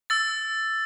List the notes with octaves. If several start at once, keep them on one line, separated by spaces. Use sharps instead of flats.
E6 A6